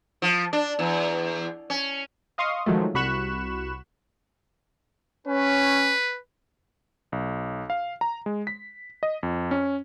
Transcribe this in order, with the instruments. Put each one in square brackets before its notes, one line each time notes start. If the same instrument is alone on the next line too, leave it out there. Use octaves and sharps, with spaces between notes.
[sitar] F3
D4
E2
C#4
[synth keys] D#5 F5 C6 C#6 D#6
D#3 F3 F#3 G#3 A3
C2 F#4 B5 C#6 F#6 E7
[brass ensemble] C#4 [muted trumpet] B4
[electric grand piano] B1
F5
A#5
G#3
B6
D#5
F2
C#4